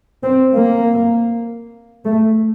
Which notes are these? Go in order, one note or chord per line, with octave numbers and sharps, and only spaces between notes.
C4
A#3
A3